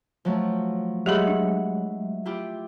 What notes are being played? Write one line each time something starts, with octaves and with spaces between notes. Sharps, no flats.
F3 F#3 A3
F#3 G#3 G4 G#4 E5 F#5 B5
D4
E4 F4 G4